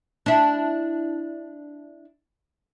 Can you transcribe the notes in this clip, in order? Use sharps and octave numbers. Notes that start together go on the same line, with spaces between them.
D4 E4